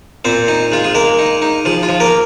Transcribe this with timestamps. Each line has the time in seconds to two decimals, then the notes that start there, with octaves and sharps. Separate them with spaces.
0.25 A#2 C4 C5
0.48 D#4
0.72 G#3 F4
0.84 G#4
0.95 G#3 A#3 A#4
1.19 D#4
1.42 D#4
1.65 F3 G#4
1.83 F4
1.89 F3
2.00 A#3 A#4